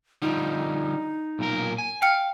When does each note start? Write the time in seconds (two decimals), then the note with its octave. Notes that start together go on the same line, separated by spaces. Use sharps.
0.22 D3 F3 G3 D#4
1.39 B1 A#2 A#4
1.78 G#5
2.02 F5 G5 F6 C#7